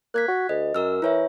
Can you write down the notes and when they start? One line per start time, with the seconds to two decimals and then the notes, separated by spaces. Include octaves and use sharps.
0.14 A#3 F#6 G#6 B6
0.28 F#4
0.49 D2 D#5
0.75 F#2 A#4 E6 F6
1.02 E3 E4 C#5 E5